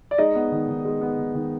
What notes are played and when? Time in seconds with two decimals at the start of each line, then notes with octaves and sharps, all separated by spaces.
0.11 D5
0.18 G#3 D#4 D#5
0.35 B3
0.52 D#3
0.68 D#3
0.85 G#3
1.01 B3
1.18 D#3
1.35 D#3